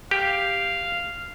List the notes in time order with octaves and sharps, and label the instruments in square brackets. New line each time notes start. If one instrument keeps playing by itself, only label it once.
[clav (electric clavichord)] G4 [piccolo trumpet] F5